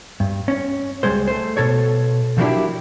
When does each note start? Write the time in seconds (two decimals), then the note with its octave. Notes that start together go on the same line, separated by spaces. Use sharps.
0.20 G2
0.48 C#4
1.03 C#2 G3 G#3 C5
1.28 A3 C5
1.57 B2 A4 C#5
2.38 F3 F#3 A#3 D4 E4 G4